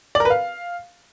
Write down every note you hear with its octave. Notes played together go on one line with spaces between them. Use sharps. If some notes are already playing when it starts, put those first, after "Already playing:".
D5
A#4
B4
F5